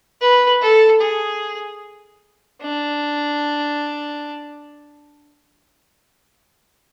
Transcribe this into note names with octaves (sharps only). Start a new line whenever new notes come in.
B4
A4
G#4
D4